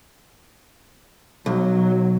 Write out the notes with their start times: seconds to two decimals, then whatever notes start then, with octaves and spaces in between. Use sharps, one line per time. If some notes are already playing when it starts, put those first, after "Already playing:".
1.46 B1 F#3